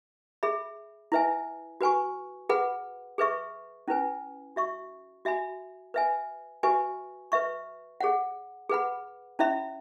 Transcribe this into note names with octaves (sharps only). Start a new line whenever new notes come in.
G#4 E5 B5
E4 B4 E5 G#5
F#4 B4 G#5 C#6
G#4 B4 F#5 B5
G#4 B4 E5 C#6
C#4 E4 B4 G#5
F#4 E5 C#6
F#4 E5 G#5 B5
B4 E5 G#5
F#4 B4 E5 G#5 C#6
B4 E5 C#6
G#4 C#5 F#5
G#4 B4 F#5 B5
C#4 E4 C#5 E5 B5